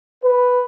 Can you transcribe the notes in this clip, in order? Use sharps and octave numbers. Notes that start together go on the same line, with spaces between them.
B4